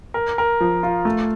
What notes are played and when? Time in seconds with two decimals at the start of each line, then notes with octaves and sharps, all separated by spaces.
0.14 A#4
0.38 A#4
0.61 F3
0.83 F4
1.05 A3